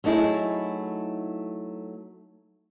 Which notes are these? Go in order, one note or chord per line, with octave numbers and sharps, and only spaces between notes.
F#3 A3 D#4 E4 G#4